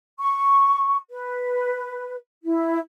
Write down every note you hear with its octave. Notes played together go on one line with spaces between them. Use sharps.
C#6
B4
E4